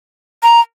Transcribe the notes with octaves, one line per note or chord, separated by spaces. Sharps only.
A#5